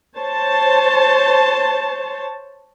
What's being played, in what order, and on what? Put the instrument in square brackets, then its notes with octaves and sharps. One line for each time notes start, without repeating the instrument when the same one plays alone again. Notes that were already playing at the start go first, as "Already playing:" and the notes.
[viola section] C5 C#5 A5